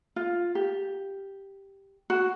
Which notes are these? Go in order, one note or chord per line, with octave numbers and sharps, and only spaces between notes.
F4
G4
F#4